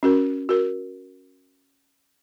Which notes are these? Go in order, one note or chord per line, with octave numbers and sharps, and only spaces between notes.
C#4 F#4 A#4
F#4 A#4